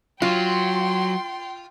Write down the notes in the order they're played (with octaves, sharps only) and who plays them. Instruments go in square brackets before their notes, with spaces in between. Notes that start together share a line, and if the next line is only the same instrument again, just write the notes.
[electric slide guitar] F#3 [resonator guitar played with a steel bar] F4 [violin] G5 C6